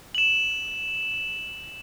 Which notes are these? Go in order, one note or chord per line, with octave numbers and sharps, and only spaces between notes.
E7 F#7